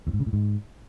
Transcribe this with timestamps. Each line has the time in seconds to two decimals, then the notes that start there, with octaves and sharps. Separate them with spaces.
0.07 E2
0.13 G#2
0.20 C#3
0.26 A2
0.33 G#2